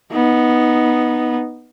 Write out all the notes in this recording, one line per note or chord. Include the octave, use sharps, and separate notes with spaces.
B3 D#4